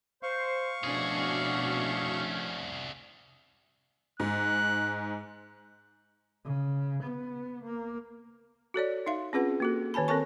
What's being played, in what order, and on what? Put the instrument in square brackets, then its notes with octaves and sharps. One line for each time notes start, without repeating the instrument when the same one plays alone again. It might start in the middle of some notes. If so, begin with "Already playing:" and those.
[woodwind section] C5 [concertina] F5 C#6
[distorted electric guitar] C2 G#4 [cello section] B2 D4 F#4 [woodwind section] F3 A3 C#4
[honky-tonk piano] G#2 [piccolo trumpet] F#6
[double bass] C#3
B3
A#3
[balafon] F#4 A4 C#5 D5
D#4 E5 F5 C6
C4 C#4 F4 G#4 B4 F#5
A#3 F#4 A4
D#3 C#5 G#5 A5 B5
C4 A4 A#4 C#5 A5 C#6